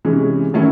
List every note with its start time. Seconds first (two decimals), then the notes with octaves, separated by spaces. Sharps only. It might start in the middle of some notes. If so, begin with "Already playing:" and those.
0.05 C3 E3 G#3 C#4
0.53 D#3 F#3 A3 C#4 E4